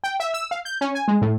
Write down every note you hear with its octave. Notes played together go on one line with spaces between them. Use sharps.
G5
E5
E6
F5
G6
C#4
G#5
G#3
A2